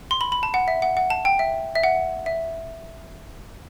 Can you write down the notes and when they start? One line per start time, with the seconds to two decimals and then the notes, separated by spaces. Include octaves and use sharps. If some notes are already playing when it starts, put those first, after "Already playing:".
0.11 C6
0.21 B5
0.32 B5
0.43 A5
0.54 F#5
0.68 E5
0.82 F#5
0.97 F#5
1.10 A5
1.25 G5
1.39 E5
1.75 E5
1.83 F#5
2.26 E5